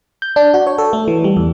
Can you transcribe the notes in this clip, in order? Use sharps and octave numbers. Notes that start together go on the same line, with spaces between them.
G6
D4
F#4
C#5
A4
A3
E3
G3
E2